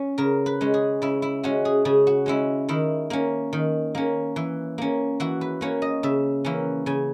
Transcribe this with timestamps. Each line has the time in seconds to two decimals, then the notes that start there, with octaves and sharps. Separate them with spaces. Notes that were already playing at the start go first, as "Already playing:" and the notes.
Already playing: C#4
0.18 C#3 A#4
0.46 B4
0.61 G#3 C#4
0.74 G#4
1.02 C#3 E4
1.22 E4
1.43 G#3 C#4 F#4
1.65 G#4
1.85 C#3 G#4
2.07 F#4
2.26 G#3 C#4 E4
2.69 D#3 E4
3.10 A#3 C#4
3.53 D#3
3.95 A#3 C#4
4.36 E3
4.78 A#3 C#4
5.20 E3 F#4
5.41 B4
5.61 A#3 C#4 C#5
5.82 D#5
6.03 C#3 E5
6.45 E3 A#3 C#4
6.86 C#3 G#5